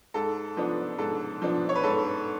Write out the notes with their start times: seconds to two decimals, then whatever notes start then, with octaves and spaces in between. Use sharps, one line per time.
0.14 G#2 A4
0.57 F3 B3 D4
0.98 G#2 A4
1.42 F3 B3 D4
1.69 C#5
1.75 B4
1.84 G#2 A4